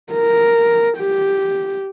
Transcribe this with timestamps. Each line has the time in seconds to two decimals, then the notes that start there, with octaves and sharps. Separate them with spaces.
0.12 A#4
0.98 G4